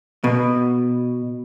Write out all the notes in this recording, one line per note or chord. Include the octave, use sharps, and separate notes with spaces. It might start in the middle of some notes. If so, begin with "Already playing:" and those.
B2